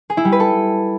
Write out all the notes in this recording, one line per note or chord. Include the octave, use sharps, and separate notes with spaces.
G#4
E4
G3
B4
A4